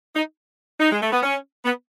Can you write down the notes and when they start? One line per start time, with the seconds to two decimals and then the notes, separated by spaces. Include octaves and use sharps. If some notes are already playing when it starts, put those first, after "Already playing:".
0.15 D#4
0.80 D#4
0.92 G#3
1.02 A3
1.12 B3
1.23 C#4
1.65 B3